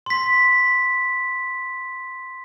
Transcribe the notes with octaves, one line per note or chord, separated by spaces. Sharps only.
C6 B6